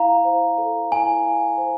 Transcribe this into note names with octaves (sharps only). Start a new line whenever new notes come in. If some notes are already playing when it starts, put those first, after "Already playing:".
Already playing: E4 F5 A#5
C5
A4
E4 G#5
F5
C5